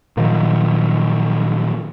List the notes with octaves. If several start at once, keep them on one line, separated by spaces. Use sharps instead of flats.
A#2 D#3 F3 F#3